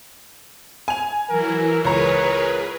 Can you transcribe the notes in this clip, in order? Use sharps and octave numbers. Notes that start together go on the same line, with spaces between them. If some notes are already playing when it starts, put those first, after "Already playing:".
G#5 F7
E3 F#3 E4 A#4
C#2 G#4 A#4 B4 C#5 A#5